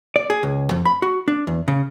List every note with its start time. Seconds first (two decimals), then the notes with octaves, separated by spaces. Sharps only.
0.16 D5
0.30 G#4
0.43 C#2
0.71 F2
0.85 B5
1.02 F#4
1.28 D4
1.47 E2
1.68 C#3